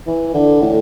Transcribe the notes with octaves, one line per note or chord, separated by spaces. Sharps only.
E3
D3
A2